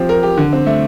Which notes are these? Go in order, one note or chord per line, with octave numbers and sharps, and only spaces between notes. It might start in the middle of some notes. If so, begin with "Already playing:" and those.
Already playing: F3 C4 G4
A#4
G4
D3
C4
A3